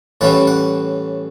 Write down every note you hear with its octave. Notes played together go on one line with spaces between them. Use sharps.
A2 E3 G3 C#4 E4 F#5
F#5